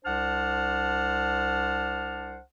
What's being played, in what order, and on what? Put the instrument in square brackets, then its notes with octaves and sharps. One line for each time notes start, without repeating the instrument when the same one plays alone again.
[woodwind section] C2 D4 C5 F#5 A5 F6